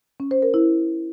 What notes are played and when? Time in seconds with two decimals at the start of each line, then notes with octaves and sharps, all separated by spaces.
0.20 C#4
0.31 C5
0.42 A#4
0.54 E4